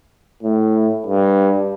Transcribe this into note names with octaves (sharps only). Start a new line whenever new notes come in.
A2
G2